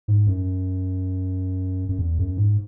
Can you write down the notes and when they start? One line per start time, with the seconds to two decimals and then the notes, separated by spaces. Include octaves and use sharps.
0.08 G#2
0.27 F#2
1.89 F#2
1.99 E2
2.19 F#2
2.37 G#2